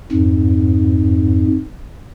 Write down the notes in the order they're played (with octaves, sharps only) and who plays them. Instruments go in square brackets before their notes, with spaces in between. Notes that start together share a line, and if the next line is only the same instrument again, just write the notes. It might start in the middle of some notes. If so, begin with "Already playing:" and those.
[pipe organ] F2 G#2